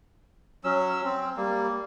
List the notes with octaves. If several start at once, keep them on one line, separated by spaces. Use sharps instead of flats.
F#3 C#4 E6
C4
G3 A#3